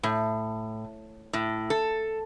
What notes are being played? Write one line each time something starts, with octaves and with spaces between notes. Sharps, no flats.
A2
A2
A4